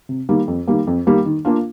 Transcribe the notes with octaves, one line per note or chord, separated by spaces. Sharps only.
C3
D#3 G3 A#3
F2
D#3 G3 A#3
F2
D#3 G3 A#3
D#3
A#3 D4 F4